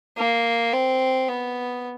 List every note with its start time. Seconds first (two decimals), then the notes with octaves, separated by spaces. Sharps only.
0.17 A#3
0.73 C4
1.28 B3